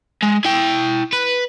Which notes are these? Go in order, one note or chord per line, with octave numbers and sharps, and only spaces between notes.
G#3
E4 G5
B4